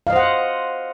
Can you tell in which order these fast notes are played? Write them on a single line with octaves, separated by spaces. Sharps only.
F5 D#5 C5 F#5